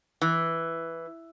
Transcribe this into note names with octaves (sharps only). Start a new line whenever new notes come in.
E3